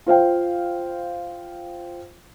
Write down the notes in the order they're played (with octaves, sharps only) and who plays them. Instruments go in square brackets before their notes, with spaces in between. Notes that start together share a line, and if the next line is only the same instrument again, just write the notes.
[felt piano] F4 C5 F5 G5